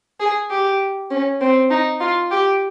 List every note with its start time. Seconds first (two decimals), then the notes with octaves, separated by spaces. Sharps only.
0.20 G#4
0.50 G4
1.11 C#4
1.41 C4
1.70 D#4
2.00 F4
2.31 G4